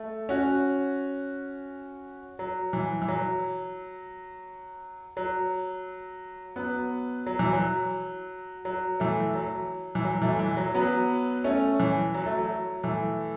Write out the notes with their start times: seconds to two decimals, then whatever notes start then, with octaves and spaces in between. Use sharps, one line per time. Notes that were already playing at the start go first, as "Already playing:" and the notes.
Already playing: A3
0.29 C#4 F#4
2.39 F#3
2.73 E3
3.02 E3
3.08 F#3
5.17 F#3
6.56 F#3 B3
7.26 F#3
7.39 E3
7.53 F#3
8.65 F#3
9.00 E3 A3
9.35 F#3
9.95 E3
10.05 F#3
10.22 E3 A3
10.39 E3
10.57 F#3
10.74 F#3 B3
11.44 A3 C#4
11.80 E3
12.14 F#3
12.26 A3
12.38 F#3
12.83 E3 A3